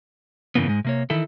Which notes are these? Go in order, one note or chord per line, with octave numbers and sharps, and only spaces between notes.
G2 C#3 E3 A#3 B3
G#2 G#3
C3 A#3 C#5
D#3 E3 E4 A4